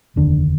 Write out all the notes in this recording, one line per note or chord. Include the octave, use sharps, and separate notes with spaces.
F1 D#2 D3 D4